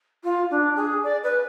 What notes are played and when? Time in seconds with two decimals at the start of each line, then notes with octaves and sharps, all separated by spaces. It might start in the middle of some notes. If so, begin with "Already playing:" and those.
0.23 F4
0.50 D4
0.76 G#4
1.03 D5
1.23 B4